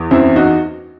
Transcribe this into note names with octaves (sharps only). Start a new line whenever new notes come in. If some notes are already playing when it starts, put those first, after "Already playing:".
Already playing: E2
F#2 C4 E4
D#4 F#4